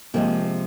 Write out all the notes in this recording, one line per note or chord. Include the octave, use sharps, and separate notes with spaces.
C3 F3 G#3 A#3